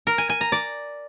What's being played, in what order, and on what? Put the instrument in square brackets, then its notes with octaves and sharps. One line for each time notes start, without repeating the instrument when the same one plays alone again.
[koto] A#4
G#5
G#5
A#5
D5